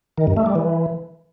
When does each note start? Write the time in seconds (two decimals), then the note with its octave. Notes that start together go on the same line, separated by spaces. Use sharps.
0.18 D#3
0.27 G2
0.37 A3
0.46 G3
0.55 E3